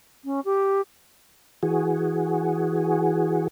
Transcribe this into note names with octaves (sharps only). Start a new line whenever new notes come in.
C#4
G4
E3 F#4 G#4